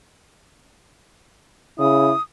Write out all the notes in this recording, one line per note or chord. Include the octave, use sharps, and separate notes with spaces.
C#3 E4 D#6